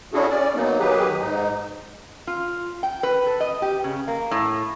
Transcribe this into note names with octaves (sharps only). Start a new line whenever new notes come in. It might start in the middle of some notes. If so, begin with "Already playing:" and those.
C#4 D4 E4 F#4 G#4 A4
C#4 D5
F#3 A#3 B3 D#4
D#3 F#3 G4 G#4 B4
G#2 D#4
F4
G5
B4
A4
D#5
G4
C#3
A#3
A2